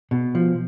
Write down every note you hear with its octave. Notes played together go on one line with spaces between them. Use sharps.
B2
F3